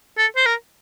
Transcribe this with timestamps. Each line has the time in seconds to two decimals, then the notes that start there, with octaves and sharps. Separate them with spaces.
0.18 A4
0.36 C5
0.46 A#4